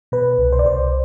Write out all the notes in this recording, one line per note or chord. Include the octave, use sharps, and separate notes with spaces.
B2 B4
C2
C5
D5
C2 C5